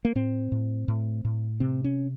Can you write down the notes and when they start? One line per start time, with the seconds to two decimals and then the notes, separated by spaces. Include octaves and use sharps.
0.05 A#3
0.15 A2 C4
0.52 A2
0.88 A2
1.25 A2
1.60 C3 C4
1.84 C#4